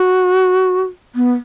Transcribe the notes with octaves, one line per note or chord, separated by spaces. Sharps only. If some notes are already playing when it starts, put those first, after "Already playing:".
Already playing: F#4
B3